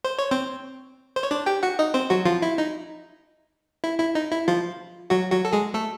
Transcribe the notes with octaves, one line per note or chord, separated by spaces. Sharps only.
C5
C#5
C4 C5
C5
C#5
D4 D5
G4 G5
F#4 F#5
D#4 D#5
C4 C5
F#3 F#4
F3 F4
E4
D#4
E4
E4
D#4
E4
F3 F4
F#3 F#4
F#3 F#4
A4
G#3 G#4
A3 A4